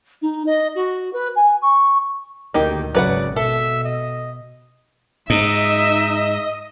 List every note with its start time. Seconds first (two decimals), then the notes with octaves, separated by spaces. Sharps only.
0.22 D#4
0.46 D#5
0.75 F#4
1.13 B4
1.36 G#5
1.62 C#6
2.54 D2 D#3 A#3 D#4 G4
2.95 G#1 C#3 F#3 B4 D5 F#5
3.36 B2 A4 E5
3.84 D#5
5.30 G#2 D#4 D#5 E5